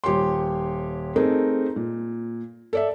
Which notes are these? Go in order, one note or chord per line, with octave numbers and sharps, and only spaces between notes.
D#1 G4 C#5 C6
A3 C4 D#4 G#4 A#4
A#2
A4 D5 E5